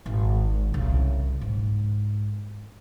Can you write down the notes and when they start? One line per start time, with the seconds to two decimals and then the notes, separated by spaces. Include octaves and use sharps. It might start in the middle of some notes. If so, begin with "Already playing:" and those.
0.06 G#1
0.74 C2 C#3
1.41 G#2